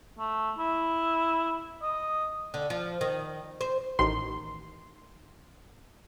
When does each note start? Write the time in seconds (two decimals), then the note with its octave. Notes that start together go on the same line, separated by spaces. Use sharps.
0.19 A3
0.59 E4
1.82 D#5
2.54 D3
2.70 F3
3.01 D#3
3.61 C5
3.99 A1 D#3 C6